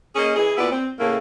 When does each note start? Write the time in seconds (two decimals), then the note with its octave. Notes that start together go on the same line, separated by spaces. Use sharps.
0.15 A#3 C#4 G#4 D#5
0.36 E3 G#4
0.57 A#2 B3 E4 F#4 D5
0.71 C4
0.98 A2 C#3 A3 A#3